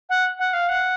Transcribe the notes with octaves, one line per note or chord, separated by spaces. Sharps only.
F#5
F#5
F5
F#5